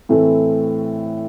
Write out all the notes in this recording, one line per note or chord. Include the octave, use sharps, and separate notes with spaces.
A2 E3 A3 C4